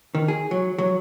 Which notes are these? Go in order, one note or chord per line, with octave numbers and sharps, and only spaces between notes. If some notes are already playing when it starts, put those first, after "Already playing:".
D#3
G#4
F#3
F#3